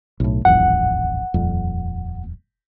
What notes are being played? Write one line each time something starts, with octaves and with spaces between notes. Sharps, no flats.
B1 A2
D#1 A1 F2 F#5
D#1 F2